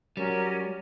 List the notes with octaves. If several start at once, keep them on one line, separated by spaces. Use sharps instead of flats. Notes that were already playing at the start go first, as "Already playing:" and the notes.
F#3 G3 C#4 A#4